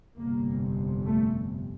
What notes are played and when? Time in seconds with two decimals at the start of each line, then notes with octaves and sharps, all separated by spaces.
0.18 G1 F2 C3 A#3
1.05 A3